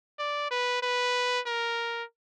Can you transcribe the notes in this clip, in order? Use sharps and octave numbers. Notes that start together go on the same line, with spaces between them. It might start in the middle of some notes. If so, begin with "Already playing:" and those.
D5
B4
B4
A#4